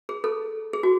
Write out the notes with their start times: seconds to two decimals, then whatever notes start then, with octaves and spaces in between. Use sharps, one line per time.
0.09 G#4
0.24 A4
0.73 G#4
0.83 F#4